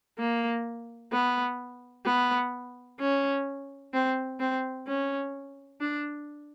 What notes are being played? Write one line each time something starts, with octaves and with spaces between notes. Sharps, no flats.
A#3
B3
B3
C#4
C4
C4
C#4
D4